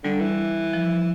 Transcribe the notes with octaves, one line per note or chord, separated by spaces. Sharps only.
D3 G3
E3
F3